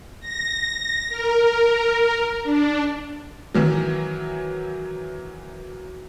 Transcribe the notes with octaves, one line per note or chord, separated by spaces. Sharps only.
A#6
A#4
D4
D#3 E3 F#3